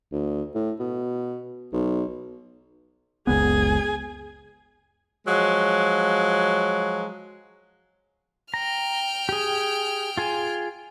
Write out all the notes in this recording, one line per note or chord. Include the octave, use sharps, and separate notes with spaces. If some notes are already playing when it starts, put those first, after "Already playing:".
D2
A2
B2
B1
F#1 C#2 B3 G#4 G#5
F3 F#3 G#3
G5 A#5 F6
G4 G#4
F4 G#4 G#5